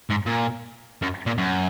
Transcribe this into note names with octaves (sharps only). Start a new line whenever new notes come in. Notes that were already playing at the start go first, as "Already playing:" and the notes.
G#2
A#2
F#2
A#2
F#2